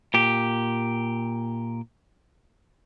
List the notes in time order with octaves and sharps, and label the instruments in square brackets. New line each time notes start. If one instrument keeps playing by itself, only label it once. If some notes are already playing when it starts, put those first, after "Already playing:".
[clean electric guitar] A#2 G4